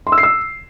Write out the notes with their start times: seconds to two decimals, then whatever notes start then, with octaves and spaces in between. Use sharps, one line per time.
0.07 C6
0.12 E6
0.18 C7
0.23 E6